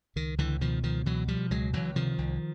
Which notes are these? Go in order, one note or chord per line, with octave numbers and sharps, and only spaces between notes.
C#2 D#3
C#2 D3 E3
B2 D#3 F3
C#2 D#3 F3
B2 E3 F#3
B2 F3 G3
C#2 F#3 G#3
C#2 E3 F#3
C3 D#3 F3
C2